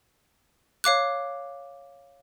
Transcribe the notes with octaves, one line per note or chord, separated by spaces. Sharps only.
C#5 F5 D6 F#6